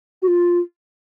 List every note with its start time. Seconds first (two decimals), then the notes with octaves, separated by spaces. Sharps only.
0.22 F#4
0.27 F4